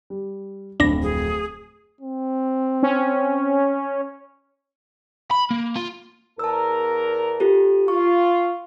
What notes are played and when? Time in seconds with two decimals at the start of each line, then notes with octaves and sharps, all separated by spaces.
0.10 G3
0.80 D1 F2 D4 B5 A#6
1.02 G#4
2.01 C4
2.83 C#4
5.31 B5
5.51 A#3
5.75 F4
6.39 E2 A#4 A5 E6
7.40 F4 G4 A4
7.88 F4 C#6